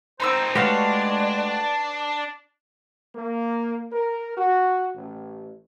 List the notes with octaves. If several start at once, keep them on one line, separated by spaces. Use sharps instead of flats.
C4 D#4 C5 A#5 B5 E6
G#3 A3 D4 F#4 G4 B4 C#5 F5
A#3
A#4
F#4
A1